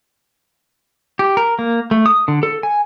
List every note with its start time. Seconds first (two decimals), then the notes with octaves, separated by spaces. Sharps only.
1.19 G4
1.37 A#4
1.59 A#3
1.91 A3
2.06 D#6
2.28 D3
2.43 A4
2.63 G#5